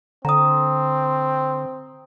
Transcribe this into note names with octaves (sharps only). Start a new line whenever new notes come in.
D3 C4 A#5 D#6